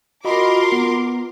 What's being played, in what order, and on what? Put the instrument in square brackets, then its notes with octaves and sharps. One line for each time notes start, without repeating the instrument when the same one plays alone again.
[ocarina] F4 [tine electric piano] F#4 D#5 B5 [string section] A#4 C6 D6
[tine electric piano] B3